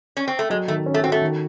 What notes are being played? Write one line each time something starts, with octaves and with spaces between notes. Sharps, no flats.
C#4
C4
A3
F#3 G#3
D#3 A3
C#4
A3
C4 F#4
A3
D#3